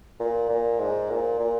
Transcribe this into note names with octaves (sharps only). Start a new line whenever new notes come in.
A#2
A#2
G#2
A#2
A#2